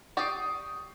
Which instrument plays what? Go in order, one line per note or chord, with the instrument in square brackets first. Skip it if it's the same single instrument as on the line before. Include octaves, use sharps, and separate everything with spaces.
[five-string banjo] G4 D5 G5 [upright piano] C#6 D#6 C7